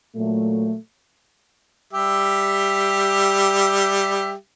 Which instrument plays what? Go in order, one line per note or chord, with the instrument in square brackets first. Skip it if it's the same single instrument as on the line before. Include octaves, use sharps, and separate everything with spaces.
[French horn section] A#2 F#3 A3
[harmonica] G3 G4 E5